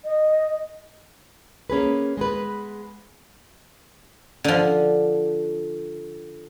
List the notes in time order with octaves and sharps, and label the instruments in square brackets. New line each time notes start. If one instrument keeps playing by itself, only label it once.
[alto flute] D#5
[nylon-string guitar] A#3 C#4 G#4 B4
G#3 B3 B4
[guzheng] D3 F3